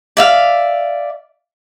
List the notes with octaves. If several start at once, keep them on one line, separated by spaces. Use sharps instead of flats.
D5 E5 F5